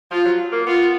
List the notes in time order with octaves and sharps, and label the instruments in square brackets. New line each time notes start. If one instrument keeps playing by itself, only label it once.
[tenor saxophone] F3 [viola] F4
[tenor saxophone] F#3
A#3
[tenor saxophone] B3 [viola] F4